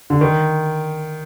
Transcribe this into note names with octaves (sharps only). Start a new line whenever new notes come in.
D3
D#3